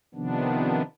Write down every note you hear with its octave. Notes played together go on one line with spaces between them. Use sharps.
C3 D#3 F3 B3 D4